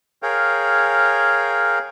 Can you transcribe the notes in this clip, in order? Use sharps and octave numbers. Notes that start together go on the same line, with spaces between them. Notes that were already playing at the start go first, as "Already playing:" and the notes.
G#4 A#4 C#5 F5 G5